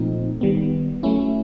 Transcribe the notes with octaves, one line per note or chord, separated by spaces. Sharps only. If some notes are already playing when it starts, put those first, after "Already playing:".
Already playing: A#2 F3 A3 C4 D#4
D#3 G3 B3
F#3 A3 C#4 E4